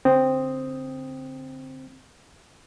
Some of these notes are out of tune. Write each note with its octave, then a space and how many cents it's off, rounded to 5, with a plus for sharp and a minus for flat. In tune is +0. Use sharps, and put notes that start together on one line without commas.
D3 -15 C4 +0 D#6 +0